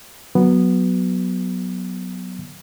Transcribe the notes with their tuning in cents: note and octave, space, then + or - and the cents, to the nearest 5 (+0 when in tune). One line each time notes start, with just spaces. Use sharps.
F#3 +0 B3 -5